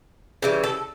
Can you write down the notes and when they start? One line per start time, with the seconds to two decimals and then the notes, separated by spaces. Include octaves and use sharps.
0.42 C#3 E3 G3 G4
0.64 A4